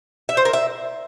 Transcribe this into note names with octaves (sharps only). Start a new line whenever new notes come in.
E5
C5
A#4
E5